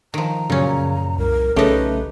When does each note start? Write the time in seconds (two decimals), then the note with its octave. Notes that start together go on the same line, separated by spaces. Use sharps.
0.14 D#3 F3 A#5
0.50 F#2 A#2 C#3 C#4
1.18 C2 A#4
1.56 B1 C#3 A3 D#4 G4 B4